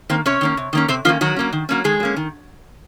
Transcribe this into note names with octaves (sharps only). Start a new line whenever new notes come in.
D#3 A#3 C4 C5
C3 C#4 C#5
D#3 A#3 C#4
C3
D#3 A#3 C#4
C3 C4 C5
D#3 F3 A#3 C#4 F4
D#3 F#3 F#4
F#3 A#3 C#4
D#3
F#3 A#3 C#4
D#3 G#3 G#4
F#3
A#3 C#4
D#3